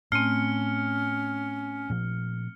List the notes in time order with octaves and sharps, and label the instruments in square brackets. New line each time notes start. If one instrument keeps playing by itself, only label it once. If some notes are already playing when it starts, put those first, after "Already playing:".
[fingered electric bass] A2 [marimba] A3 C4 [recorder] C#4 [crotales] F6 C#7
[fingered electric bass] A#2 F3